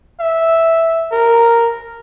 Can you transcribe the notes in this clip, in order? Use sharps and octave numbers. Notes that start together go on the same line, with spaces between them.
E5
A#4